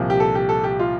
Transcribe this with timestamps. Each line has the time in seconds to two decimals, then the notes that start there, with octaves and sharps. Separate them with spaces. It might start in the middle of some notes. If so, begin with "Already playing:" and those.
Already playing: C2 A#2 F3
0.10 G4
0.20 A4
0.35 G4
0.49 A4
0.64 G4
0.79 F4